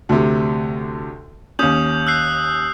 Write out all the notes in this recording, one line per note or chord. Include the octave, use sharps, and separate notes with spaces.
D2 C3
D#2 C#4 D#6 G6 F#7
E6 F#6 C7